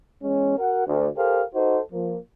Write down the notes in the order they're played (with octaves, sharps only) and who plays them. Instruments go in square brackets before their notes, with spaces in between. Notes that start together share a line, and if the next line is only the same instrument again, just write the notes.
[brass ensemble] E2 G#3 C#4
F#4 A#4 F#5
D2
G4 A4 A#4 C5 F5
D#4 F#4 A4 C5
F3 A#3